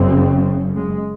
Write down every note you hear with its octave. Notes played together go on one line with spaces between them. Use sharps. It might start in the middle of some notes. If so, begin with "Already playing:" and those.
Already playing: F#1 F#2 C#3 C4
G#3